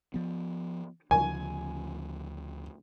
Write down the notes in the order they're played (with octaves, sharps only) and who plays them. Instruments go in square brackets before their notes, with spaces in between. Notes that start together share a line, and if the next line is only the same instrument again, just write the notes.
[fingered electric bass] F3 B3
[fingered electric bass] D2 C#3 F3 [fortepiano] G#5